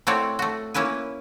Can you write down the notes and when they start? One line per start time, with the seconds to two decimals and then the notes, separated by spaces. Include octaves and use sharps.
0.07 A3 C4 E4 F#4 C#5 D5
0.39 A3 F#4
0.74 A#3 C#4 E4 B4 G#5